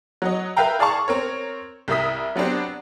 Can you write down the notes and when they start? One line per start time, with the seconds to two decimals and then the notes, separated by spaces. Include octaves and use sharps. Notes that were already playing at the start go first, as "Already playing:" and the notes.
0.22 F#3 F#4 D#5
0.56 A#4 B4 E5 F5 G5 A#5
0.79 G#4 D5 F5 A5 C#6
1.08 C4 A#4 C#5
1.88 C2 G3 A#4 E5 D#6 B6
2.36 F#3 B3 C4 D4 G4